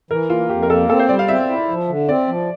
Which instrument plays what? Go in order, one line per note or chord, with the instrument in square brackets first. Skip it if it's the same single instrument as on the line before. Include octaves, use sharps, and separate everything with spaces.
[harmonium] E3 [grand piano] A#4
[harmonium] A#3 [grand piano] F4
[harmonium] F2 [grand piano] G4
[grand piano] A#4
[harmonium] A#3 [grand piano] A4
[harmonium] C4 [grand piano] A4
[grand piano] C5
[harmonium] G3 [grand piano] D5
[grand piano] F5
[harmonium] C4 [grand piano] E5
[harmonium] E4
F3
D3
[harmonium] C4 [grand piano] D5
[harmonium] F3